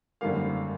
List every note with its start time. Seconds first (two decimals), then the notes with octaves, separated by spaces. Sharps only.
0.21 G#1 F#2 D3 G3 A#3 F5